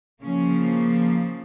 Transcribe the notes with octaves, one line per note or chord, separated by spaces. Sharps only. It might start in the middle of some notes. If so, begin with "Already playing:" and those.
C#3 F3 A#3 C#4